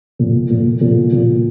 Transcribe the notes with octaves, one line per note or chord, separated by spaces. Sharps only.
A#2
A#2
A#2
A#2